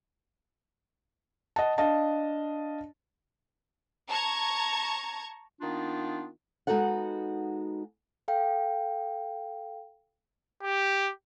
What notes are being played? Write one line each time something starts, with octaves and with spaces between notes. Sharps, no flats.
D#5 F#5 A5
D4 D#5 F5 A5
A5 A#5 C#6 G#6
D#3 A#3 B3 D4 D#4 F4
G#3 B3 D#4 F#4 A4 F#5
A4 F5 G5
G4